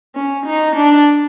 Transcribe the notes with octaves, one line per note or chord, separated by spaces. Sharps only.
C#4
D#4
D4